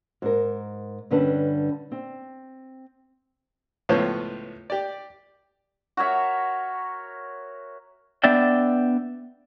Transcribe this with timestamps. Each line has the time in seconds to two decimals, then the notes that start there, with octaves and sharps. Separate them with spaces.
0.22 G#2 A#4
1.10 G2 D3 G3 C#4 B4 A5
1.92 C4
3.89 C#2 A2 F3 B3 C5 C#5
4.70 G4 D5
5.97 F#4 A#4 C#5 E5
8.24 B3 D4 D5 E5 G5